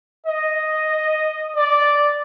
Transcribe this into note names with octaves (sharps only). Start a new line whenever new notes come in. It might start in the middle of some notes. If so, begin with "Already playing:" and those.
D#5
D5